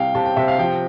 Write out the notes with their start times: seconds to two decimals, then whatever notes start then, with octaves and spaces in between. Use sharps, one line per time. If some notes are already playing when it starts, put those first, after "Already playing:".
Already playing: C2 G3 F5 G5
0.15 C3 A5
0.25 G5
0.36 C3 E5
0.48 F5
0.59 F3 G5